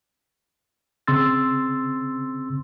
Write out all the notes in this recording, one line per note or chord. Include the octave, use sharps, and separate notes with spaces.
C#3 C4 C6 E6 A6